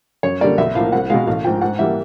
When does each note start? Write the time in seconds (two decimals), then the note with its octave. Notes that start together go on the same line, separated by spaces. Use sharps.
0.23 F#2 C#5
0.41 D3 G3 A#3 D5
0.58 B1 E5
0.75 A2 F3 A#3 F5
0.92 C2 F#5
1.10 B2 G#3 F5
1.27 A1 F5
1.44 G#2 F3 G5
1.61 G#2 F#5
1.79 E3 G3 A#3 E5